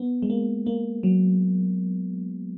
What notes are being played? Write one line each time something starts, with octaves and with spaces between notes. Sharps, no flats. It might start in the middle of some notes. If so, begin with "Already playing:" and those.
Already playing: B3
G#3
A#3
A#3
F#3